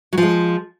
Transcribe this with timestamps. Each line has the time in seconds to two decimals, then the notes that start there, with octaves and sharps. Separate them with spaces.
0.13 F#3
0.18 F3
0.22 G#3